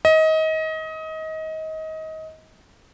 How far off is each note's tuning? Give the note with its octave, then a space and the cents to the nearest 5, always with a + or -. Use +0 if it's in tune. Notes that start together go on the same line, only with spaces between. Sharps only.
D#5 +25